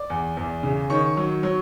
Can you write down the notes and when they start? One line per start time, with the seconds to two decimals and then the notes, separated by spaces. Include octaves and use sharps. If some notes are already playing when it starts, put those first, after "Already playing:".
Already playing: D5 D6
0.10 E2
0.37 E2
0.63 C#3
0.90 D#3 C#5 C#6
1.17 F#3
1.43 F#3